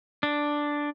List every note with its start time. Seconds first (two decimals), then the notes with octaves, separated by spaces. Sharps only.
0.23 D4